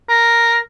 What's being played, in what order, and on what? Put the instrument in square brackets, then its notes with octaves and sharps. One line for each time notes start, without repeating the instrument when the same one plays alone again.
[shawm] A#4